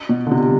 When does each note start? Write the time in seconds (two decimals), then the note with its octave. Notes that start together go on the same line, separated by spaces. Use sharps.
0.09 B2
0.27 D3
0.31 C3
0.44 G3